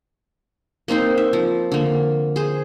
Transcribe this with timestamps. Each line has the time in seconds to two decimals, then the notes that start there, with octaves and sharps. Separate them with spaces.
0.88 A#3 C4 D#4 C5
1.18 E5
1.33 F3
1.72 D3 A#3
2.36 G#4 C5